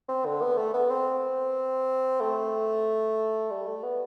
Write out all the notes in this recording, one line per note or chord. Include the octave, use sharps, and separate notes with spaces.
C4
D3
B3
A3
B3
C4
A3
G3
A3
B3